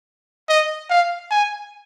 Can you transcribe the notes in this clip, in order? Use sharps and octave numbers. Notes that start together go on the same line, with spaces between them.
D#5
F5
G#5